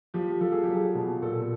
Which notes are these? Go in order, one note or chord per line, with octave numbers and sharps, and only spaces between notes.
F3 G4
F3 A4
G#4
F#3 G4
G#4
B2
A#2 A4